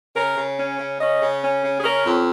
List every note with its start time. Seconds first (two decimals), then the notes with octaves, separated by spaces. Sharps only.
0.16 C#3 A#4
0.37 C#3
0.57 C#4
0.78 C#3
0.99 C#4 D#5
1.21 C#3
1.41 C#4
1.63 C#3
1.77 G#4
1.83 C#4 A#4
2.05 F2